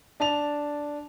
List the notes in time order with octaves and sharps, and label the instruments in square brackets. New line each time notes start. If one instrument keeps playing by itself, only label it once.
[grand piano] D4 A5 F7